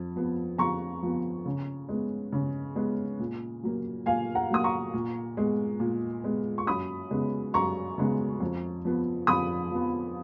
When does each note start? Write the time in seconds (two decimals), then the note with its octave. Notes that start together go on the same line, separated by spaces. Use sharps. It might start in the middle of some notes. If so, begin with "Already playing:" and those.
Already playing: F2
0.16 F3 B3
0.58 F2 A#5 C#6
1.02 F3 B3
1.46 C#3
1.89 G#3 B3
2.32 C#3
2.76 G#3 B3
3.19 A#2
3.63 F#3 A#3
4.06 A#2 F5 G#5
4.35 F#5 A#5
4.50 F#3 A#3 D#6
4.64 A#5 C#6
4.93 A#2
5.37 G#3 B3
5.80 A#2
6.24 G#3 B3
6.58 C#6
6.67 F#2 B5 D#6
7.11 C#3 G#3 B3
7.54 F#2 A#5 C#6
7.98 C#3 G#3 B3
8.40 F2
8.85 F3 B3
9.27 F2 B5 D#6
9.71 F3 B3